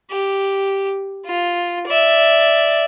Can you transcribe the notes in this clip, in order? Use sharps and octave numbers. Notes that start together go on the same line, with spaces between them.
G4
F4
D5 E5